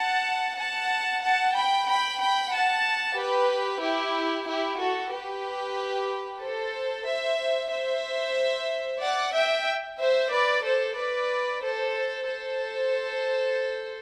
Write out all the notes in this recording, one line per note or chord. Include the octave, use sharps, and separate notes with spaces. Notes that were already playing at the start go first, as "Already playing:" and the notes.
Already playing: F#5 A5
F#5 A5
F#5 A5
G5 B5
G5 B5
G5 B5
F#5 A5
G4 B4
E4 G4
E4 G4
F#4 A4
G4 B4
A4 C5
C5 E5
C5 E5
D5 F#5
E5 G5
C5 E5
B4 D5
A4 C5
B4 D5
A4 C5
A4 C5